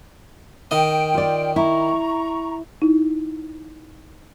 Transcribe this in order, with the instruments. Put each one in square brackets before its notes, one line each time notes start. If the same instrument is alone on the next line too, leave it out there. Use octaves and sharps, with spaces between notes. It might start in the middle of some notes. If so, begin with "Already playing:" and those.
[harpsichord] D#3 D#5 [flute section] G5
[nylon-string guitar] F4 D5
[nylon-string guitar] E4 [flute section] A#5 C#6
[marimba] D#4 E4